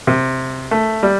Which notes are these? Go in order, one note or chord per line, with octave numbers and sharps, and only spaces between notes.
C3
A3
G3